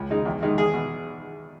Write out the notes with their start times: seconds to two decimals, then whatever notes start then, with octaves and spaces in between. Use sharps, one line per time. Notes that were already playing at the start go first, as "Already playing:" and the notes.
Already playing: C#2
0.10 C#3 G#3 D#4
0.25 E2
0.42 D#3 G#3 D#4
0.58 E2 G#4
0.74 B2